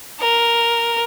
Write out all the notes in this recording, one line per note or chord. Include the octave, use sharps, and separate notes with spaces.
A#4